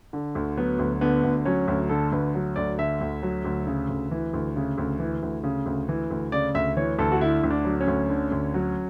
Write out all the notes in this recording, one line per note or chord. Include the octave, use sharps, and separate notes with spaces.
D3
D2
F#3 B3
D2
D3 B3
D2
F#3 C#4
D2
D3 A4
D2 B4
F#3
D2 D5
D3 E5
D2
F#3
D2
C#3
D2
E3
D2
C#3
D2
E3
D2
C#3
D2
E3
D2
C#3 D5
D2 E5
E3 C#5
D2 A4
F#4
D3 E4
D2
D4
F#3
C#4
D2
D3
D2
F#3